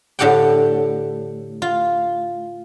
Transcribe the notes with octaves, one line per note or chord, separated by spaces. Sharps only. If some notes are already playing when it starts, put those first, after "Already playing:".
A2 D3 G4 F#5 G5
F4